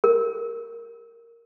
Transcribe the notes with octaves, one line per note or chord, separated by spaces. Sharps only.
A#4